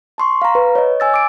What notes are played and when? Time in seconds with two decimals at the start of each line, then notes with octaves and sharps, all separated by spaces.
0.18 A5 C6 C#6
0.42 F5 A#5
0.55 B4
0.75 C#5 D#5
1.00 G#5 E6 A6
1.14 D6 D7